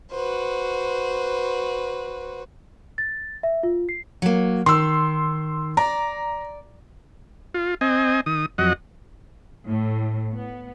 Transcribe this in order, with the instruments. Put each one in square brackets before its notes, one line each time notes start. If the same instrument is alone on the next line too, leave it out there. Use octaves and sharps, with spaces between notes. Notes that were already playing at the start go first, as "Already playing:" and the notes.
[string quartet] F#4 B4 C5
[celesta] A6
E5
F4
C7
[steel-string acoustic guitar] F#3 A#3
[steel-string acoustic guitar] D#3 [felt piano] C6 E6
[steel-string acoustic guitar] D5 [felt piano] A#5
[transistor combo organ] F4
C4 D#5 G#5
D#3 D#6
F2 F#3 D#5 F#5
[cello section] A2
B3